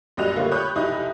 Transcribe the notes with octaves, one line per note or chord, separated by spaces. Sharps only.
A#1 F#2 G3 D#5 F#6 F7
D3 A3 A#3 F4 G4 C#5
G4 C#5 B5 D#6 F#6 G6
F1 B1 D#4 E4 G4 D#6